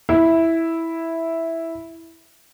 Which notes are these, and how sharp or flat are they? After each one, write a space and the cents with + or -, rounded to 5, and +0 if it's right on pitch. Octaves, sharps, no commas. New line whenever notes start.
E4 -5